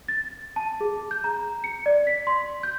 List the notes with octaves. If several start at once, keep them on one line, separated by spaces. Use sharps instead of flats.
A6
A5
G#4
G6
A#5
C#7
D5
B6
C6
G6